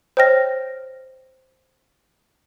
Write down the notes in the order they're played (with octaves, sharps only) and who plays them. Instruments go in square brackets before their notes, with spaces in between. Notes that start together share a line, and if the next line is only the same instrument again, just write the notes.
[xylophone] C5 C#5 D#5 G5 F6 A#6